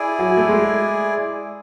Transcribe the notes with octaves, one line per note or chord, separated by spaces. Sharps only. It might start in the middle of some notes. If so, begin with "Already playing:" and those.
Already playing: E4 G#4 D5 G#5
F#3
A3
G#3